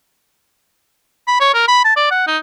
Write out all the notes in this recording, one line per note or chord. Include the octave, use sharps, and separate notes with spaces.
B5
C#5
A#4
B5
A5
D5
F#5
D#4